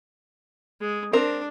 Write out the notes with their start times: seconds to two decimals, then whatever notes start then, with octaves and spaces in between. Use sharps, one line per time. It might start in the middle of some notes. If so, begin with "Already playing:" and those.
0.81 G#3
1.13 C4 D4 A#4